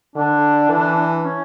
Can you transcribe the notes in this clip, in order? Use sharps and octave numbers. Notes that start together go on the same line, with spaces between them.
D3 D4
E3
C#4